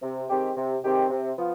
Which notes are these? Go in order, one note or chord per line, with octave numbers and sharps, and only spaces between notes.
C3
D#3 G#3 C4 G4
C3
D#3 G#3 C4 G4
C3
F3 B3 F4